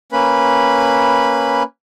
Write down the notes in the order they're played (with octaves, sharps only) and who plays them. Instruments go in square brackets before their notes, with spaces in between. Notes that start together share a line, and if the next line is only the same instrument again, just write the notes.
[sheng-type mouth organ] A#3 C#4 B4 B5